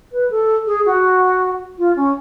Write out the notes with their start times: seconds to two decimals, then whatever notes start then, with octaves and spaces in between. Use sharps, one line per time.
0.12 B4
0.30 A4
0.67 G#4
0.85 F#4
1.78 F4
1.96 C#4